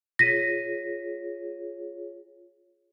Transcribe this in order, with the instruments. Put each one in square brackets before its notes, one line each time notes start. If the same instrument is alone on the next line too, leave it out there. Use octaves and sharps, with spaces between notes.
[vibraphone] F4 G#4 C#5 [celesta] A#6 B6 D#7